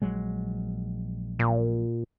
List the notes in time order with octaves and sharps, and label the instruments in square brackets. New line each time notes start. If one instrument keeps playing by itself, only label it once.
[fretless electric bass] A#1 F#3 G#3
[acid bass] A#2